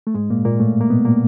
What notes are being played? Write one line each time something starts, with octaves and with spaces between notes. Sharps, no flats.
A3
G#2 G#3
A#2 A#3
A#2 A#3
A2 A3
A#3
B2 B3
A#2 A#3